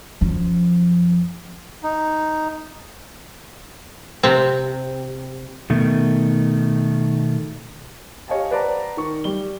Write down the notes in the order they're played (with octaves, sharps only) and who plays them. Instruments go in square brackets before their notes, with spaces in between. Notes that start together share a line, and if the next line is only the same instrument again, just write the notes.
[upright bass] F#2 F3
[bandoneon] D#4
[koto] C3 C4
[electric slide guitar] B2 D#3 A3
[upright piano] G4 C#5 D#5 F5 G#5 A5
B4 C5 D5 F#5 A5 A#5
D#3 C#6
G3 G7